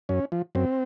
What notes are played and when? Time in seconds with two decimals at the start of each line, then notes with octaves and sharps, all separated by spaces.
0.09 F#2 C#4
0.32 F3
0.55 F#2 C4